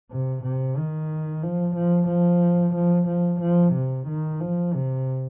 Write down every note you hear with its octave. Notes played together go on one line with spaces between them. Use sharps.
C3
C3
D#3
F3
F3
F3
F3
F3
F3
C3
D#3
F3
C3